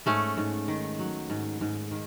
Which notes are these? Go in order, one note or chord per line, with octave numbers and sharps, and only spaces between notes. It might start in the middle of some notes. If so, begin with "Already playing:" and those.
G#2 A3 C#4
G#2
D#3
F#3
G#2
G#2
D#3